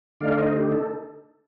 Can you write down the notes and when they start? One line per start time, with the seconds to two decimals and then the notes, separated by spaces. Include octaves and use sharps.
0.21 D3 A3 D#4 D5 F5
0.37 C5 D#5
0.55 G4
0.72 A4